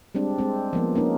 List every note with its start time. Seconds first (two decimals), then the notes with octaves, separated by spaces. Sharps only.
0.15 G3 G#3 C4 D4
0.39 G#3 C4
0.73 F3 A#3 B3
0.95 A#3 C#4 D#4